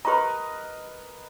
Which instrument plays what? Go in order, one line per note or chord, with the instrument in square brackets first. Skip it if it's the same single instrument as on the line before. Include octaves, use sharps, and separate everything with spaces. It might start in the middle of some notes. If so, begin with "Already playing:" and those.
[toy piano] G4 A#5 [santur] A#4 B4 D#5